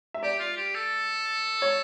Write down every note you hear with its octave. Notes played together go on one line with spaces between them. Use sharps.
E5
G4 D5
F4
G4
A4
C#5